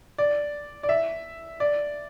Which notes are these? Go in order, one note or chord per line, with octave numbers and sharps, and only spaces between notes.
D5
D5
E5
D5